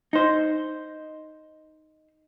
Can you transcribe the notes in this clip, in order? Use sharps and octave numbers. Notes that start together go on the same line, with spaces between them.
D#4 C5